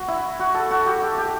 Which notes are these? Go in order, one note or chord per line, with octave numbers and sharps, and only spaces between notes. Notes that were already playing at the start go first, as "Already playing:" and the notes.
Already playing: F#4
E4
F#4
A4
F#4
G4
G4
G4